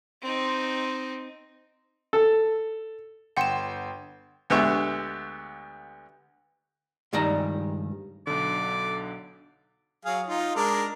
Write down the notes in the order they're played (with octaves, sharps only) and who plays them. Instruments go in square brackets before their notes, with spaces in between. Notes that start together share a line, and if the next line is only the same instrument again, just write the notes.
[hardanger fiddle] C4 D#4
[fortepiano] A4
[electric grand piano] G1 G5 C6 [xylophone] F#5 E7
[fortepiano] D2 G#3 B3 G4 E5 C#6
[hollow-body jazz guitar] C#2 G2 D#3 G3 A#5
[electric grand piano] B1 D3 [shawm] D5
[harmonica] F#3 G#4 F5
D#4 F4
G#3 D4 A#4